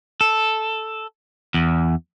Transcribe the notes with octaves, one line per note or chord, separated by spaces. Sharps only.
A4
E2